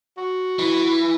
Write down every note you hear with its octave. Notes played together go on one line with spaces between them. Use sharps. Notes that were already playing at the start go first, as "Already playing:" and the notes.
F#4
E3